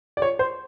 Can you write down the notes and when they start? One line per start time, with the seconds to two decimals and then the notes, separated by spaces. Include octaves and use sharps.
0.17 D5
0.22 C#5
0.39 C5